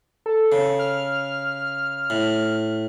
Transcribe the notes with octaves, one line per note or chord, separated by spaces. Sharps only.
A4
C#3
F6
A2